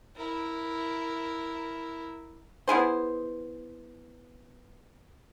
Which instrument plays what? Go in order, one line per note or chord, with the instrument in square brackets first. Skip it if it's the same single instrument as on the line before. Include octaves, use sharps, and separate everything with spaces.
[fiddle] E4 A#4
[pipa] B3 E4 G#4 C5